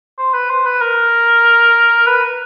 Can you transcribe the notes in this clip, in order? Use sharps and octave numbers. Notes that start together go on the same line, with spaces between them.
C5
B4
C5
B4
A#4
B4